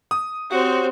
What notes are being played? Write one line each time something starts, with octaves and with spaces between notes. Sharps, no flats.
D#6
C4 F#4 G4 C5 C#5